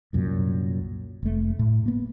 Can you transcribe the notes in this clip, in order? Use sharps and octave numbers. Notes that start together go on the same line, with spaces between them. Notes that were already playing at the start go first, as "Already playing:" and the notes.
C2 F#2 A#2
F1 A3
A2
A#3 B3